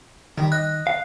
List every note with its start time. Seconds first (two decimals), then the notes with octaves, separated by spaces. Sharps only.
0.38 D#3 G3
0.52 D#5 F#6
0.87 F5